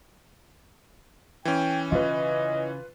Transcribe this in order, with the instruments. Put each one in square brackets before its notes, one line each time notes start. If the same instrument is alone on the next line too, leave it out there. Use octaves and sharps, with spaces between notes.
[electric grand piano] E3 C#4 [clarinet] G5
[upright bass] C#3 [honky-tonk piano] F4 B4 [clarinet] D#5